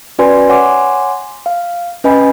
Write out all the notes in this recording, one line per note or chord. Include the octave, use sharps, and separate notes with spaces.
C#4 F#4 B4 D5 G#5 C6
C#5 F#5 G#5 C6 D6
F5
C#4 B4 D#5 G#5 B5